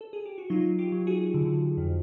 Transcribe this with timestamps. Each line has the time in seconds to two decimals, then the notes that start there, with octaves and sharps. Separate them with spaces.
0.01 A4
0.13 G#4
0.25 G4
0.38 F#4
0.50 F#3 D#4 F4
0.78 F4 G4
0.92 F#3
1.07 F#4 G#4
1.34 D3
1.77 F2